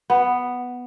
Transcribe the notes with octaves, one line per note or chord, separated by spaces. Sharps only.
B3